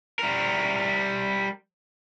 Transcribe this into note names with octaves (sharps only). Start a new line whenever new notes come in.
G3 A#4